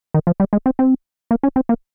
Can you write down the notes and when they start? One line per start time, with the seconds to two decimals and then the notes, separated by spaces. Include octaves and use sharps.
0.14 D#3
0.27 F3
0.40 G3
0.53 G#3
0.66 C4
0.79 C4
1.31 A#3
1.43 C#4
1.56 C4
1.69 A#3